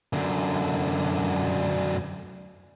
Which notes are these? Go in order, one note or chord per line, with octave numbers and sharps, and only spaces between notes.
F#2 D3